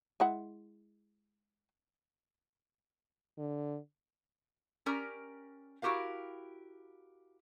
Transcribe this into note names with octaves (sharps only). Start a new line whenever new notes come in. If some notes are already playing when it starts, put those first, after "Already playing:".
G#3 E4 F#5
D3
C#4 G4 A#4 D5 A#5
E4 F#4 G4 A#4 F5